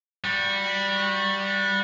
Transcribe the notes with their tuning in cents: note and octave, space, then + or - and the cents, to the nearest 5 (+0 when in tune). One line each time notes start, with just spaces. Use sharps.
G3 +0 F#4 -20